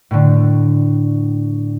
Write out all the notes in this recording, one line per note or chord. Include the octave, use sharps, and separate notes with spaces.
A2 D3